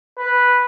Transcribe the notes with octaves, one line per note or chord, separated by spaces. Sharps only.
B4